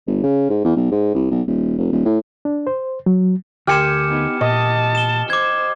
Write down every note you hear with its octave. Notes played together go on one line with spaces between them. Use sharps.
G1
C#3
G#2
E2
B1
G#2
C2
B1
D#1
F1
D#1
A2
D4
C5
F#3
D2 G4 A#4 G#5 C6 F6 C#7 E7
B3 D#4
A#2 D#5 A5
E7 G7
C5 D6 G#6